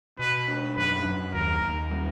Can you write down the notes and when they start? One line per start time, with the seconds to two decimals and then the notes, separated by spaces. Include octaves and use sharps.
0.19 B2 B4
0.48 D4
0.76 F#2 B4
1.05 F#2
1.33 D#2 A#4
1.62 D#2
1.91 G3